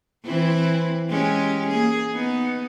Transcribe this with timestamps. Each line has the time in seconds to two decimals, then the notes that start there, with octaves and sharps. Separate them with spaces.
0.24 E3 C4 E4
1.10 G#3 C#4 G4
1.67 A#3 G#4
2.14 B3 D#4